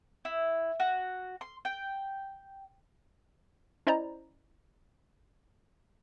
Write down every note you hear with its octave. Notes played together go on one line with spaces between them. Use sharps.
E4
F#4
C6
G5
C#4 E4 C5 D5 D#5 A#5